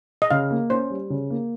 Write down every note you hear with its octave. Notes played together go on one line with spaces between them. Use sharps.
D#5
C#3 F5
A#3
C#4 C5
G3
C#3
A#3